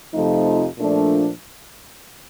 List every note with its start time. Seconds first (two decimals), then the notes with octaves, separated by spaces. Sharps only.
0.14 F2 C3 F3 A3 D#4
0.78 A#2 F3 A3 D4